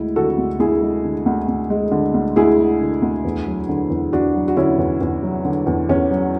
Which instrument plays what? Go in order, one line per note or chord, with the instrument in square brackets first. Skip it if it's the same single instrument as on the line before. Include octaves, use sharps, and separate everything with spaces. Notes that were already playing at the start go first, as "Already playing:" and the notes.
Already playing: [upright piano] D2 G#3 E4
D3 F#4 A4
D2
D2 E4 G#4
G#3
D3
D2
D2
G#3
D3
D2
D2 E4 G#4
G#3
D3
D2
E2
F#3
D3
E2
E2 D4 F#4
F#3
F#4
D3 C#4 E4
E2
E2
F#3
D3
E2
E2 C#4
F#3